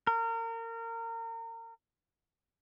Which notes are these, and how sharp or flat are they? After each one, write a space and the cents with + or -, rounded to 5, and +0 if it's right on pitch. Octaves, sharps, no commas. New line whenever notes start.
A#4 -30